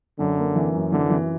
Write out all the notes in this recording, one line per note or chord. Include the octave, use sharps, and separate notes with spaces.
F#2 D3
A#3
E3
F#2
D3 E3
E3